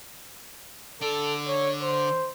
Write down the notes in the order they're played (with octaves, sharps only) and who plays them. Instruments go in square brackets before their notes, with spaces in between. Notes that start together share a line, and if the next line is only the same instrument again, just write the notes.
[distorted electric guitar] D3 D5 [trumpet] A4
[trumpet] C#5
C5